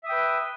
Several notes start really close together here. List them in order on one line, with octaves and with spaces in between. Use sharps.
E5 D#6 G5 B4